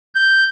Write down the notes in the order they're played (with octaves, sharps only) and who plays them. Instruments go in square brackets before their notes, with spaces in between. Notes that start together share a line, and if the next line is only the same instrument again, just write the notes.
[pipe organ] G6